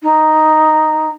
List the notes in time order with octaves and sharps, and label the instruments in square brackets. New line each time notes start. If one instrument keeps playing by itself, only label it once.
[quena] D#4